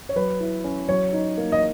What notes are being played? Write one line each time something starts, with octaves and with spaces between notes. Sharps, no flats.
C#5
F#3 B4
E4
C#4
F#3 C#5
D#4
A#3
D#5